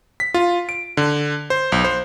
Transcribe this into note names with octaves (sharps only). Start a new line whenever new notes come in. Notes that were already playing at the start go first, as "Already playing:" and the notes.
B6
F4
D7
D3
C5
B1
C5